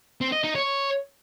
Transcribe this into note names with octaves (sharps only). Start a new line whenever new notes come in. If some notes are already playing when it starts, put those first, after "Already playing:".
C4
D#5
D#4
C#5